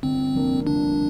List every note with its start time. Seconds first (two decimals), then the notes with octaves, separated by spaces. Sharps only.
0.03 G1 C4
0.35 F2 C3 A#3 D4
0.67 G1 D4